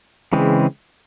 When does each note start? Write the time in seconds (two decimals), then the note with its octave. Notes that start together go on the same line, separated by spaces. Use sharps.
0.33 C#3 E3 G#3 C4